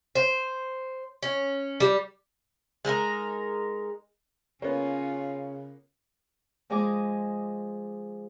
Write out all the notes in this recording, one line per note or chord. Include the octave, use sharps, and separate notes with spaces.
C5
C#4
G3
G#3 D#4 E4 A#4
C#3 A#3 B3 C#4 F4 C#5
F3 G#3 G#4 D#5 G#5 D6